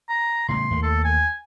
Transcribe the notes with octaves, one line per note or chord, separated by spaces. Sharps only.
A#5
A2 C#3 G3 C6
D#2 A3 A#3
A4
G#5